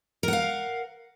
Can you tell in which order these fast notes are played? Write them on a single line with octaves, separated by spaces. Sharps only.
A#4 F#5 F5